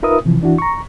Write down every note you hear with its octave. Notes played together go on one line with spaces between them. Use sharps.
D#4 F4 A#4 B4 E5 D#6
C3 E3 F3
E3 D4 E4 F#4
A#5 C#6